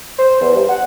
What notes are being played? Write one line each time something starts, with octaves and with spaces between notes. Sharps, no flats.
C5
E2
G2
F#5